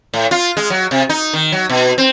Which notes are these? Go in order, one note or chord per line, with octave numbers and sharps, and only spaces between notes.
A2
F4
G#3
F#3
C3
D#4
D#3
F#3
B2
C4